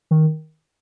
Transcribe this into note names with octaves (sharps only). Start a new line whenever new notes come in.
D#3